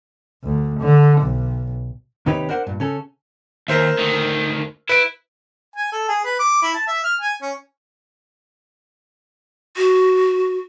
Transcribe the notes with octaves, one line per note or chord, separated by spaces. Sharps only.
D2
D3
B1
D#2 C3 D#4 G4 B4 C#5
D4 A#4 C5 F#5
G2 A#2
C#3 C#4 A4
D#2 A#4 C5 E5
D2 D#3
E4 B4 D7
G#5
A4
G#4
B4
D6
E4
A5
E5
F6
G#5
C#4
F#4